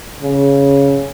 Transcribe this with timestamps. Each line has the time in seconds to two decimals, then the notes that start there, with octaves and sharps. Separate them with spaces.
0.22 C#3